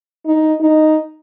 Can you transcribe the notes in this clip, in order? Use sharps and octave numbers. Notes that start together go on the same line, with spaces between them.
D#4
D#4